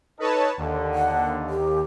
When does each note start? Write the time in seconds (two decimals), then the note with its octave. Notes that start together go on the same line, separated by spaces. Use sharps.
0.20 D#4 A4 B4 C#5 D#5 A5
0.57 D#2 D3
0.95 F#5
1.50 G4